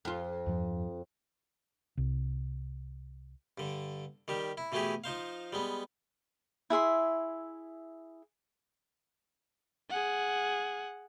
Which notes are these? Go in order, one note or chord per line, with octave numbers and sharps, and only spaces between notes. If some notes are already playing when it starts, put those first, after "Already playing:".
F2 F4
E2 G2 F3
C2
G2 D3
D#3 G3 G4
E4
B2 E3 A3 E4 G4 G#4
F3 D#4 C5 F5
G3 G#3 B3
E4 G#4 E5 C6
G#4 F#5